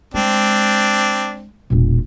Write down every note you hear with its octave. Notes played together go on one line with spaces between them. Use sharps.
G#3 C4 D4
E1 A#2